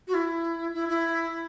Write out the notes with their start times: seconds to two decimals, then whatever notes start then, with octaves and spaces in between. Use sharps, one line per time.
0.08 F#4
0.14 E4
0.74 E4
0.89 E4